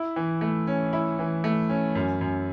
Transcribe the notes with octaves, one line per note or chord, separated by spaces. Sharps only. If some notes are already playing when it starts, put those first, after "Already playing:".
Already playing: E4
E3
A3
C#4
E4
E3
A3
C#4
F#2
F#2